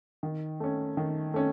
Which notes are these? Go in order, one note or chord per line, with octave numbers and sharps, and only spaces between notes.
D#3
A3 C#4
D#3
A3 C#4